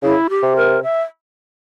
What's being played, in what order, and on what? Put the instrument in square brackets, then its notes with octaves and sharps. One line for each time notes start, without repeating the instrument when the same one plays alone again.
[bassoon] C#3 [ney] E4
[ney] G4
[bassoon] C3
[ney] A#4
E5